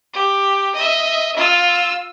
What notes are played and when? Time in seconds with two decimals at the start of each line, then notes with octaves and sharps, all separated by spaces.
0.13 G4
0.75 D#5 E5
1.36 F4 E6